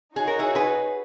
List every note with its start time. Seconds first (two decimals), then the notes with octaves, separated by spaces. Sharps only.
0.16 D#4 F#4 G#4 C#5
0.27 A#4
0.39 E4 G#4
0.55 G#4 B4